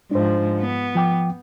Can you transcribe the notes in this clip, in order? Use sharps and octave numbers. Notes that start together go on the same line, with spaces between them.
G#2 F3 D4 C5
B3
F3 G5 D6